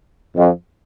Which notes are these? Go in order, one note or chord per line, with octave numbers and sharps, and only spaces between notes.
F2